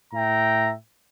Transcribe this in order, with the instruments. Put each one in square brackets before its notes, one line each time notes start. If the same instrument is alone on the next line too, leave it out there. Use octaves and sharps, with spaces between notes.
[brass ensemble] A2 E5 G5 A#5